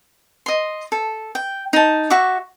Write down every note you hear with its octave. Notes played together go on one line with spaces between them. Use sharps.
D#5 C6
A4
G5
D#4 A5
F#4 E5 C#6 D6